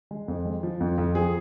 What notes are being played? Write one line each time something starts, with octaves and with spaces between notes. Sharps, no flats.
G#3
F2
G#3
F3
F2
F2
F3 G#4